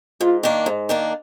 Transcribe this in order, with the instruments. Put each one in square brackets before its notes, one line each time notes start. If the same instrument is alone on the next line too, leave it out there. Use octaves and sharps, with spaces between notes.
[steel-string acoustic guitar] G#2 [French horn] F4
[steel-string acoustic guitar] D#3 A#3 D4
G#2
D#3 A#3 D4